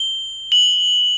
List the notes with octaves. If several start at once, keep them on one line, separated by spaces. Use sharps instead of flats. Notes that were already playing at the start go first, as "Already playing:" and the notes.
Already playing: G7
F#7